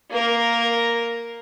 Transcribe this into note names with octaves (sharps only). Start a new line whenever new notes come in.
A#3 A#4